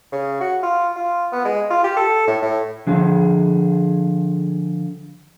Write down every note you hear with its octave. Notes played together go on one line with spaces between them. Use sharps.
C#3
F#4
F4
F4
B3
G#3
F4
G4
A4
A2
A2
D3 F3 G#4